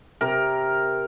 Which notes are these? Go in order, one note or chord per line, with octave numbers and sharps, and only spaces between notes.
C3 A#4